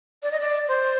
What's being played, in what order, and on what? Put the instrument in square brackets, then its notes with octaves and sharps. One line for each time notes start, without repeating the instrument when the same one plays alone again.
[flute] D5
D#5
D5
C5